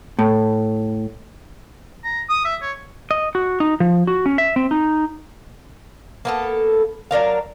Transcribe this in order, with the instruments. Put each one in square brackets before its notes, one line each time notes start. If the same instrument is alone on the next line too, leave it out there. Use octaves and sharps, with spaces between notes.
[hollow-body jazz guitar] A2
[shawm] A#5
D#6
E5
C#5
[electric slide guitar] D#5
F#4
D#4
F3
F#4
C#4
E5
C4
D#4
[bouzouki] A#3 B3 A4
F#3 D4 A#4 F5